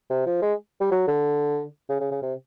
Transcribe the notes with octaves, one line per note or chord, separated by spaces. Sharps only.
C3
F3
G#3
G3
F#3
D3
C#3
C#3
C#3
C3